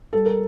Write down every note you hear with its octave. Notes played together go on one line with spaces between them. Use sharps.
G3 A4
A#4